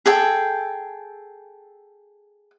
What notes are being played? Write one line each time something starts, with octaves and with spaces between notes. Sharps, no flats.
G#4 A4 G5